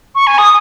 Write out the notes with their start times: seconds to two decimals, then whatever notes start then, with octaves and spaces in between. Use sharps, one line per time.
0.15 C#6
0.27 G#5
0.38 D#6